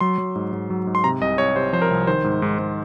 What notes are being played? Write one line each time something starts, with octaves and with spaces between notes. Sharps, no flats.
F#3 C6
F#3
G#2
G#2
F#3
G#2
C6
C3 A#5
C2 D#5
C2 C#5
C3 C5
F3 C5
A#4
C2
D#3 C5
G#2
G#2
G#2